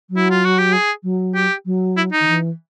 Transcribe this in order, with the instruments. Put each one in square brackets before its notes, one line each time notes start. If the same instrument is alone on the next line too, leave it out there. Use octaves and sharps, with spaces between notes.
[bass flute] F#3
[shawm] E4
F4
F#4
G4
G#4
[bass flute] F#3
[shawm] G4
[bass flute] F#3
[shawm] E4
D#4
[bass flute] D#3
E3